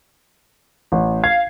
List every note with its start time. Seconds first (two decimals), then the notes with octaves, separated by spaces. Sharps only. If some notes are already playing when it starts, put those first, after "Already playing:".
0.92 A1
1.24 F5 G#6